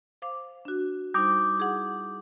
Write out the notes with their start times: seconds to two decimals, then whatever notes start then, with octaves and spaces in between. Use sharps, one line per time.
0.22 C5 F5 D6
0.65 D4 F#4
1.14 G3 D#4 C5 D6 D#6 G6
1.58 E4 G#4 F#5